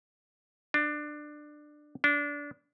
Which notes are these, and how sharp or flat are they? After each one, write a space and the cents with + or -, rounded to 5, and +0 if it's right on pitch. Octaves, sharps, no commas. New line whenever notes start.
D4 +20
D4 -20